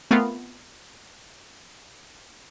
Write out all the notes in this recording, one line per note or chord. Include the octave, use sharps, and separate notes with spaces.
A3 B3 C4 F4 A#4 F5